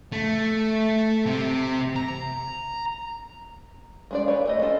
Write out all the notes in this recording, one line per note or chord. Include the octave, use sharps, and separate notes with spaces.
A3
C3
A#5
G#3 D4 D5
B4 C#5 F5
G#3 A3 D#5
D4 F4 A4 D5 D#5